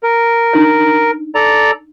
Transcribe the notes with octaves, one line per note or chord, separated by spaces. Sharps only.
A#4
D4 D#4 C#5
A4 D5 A#5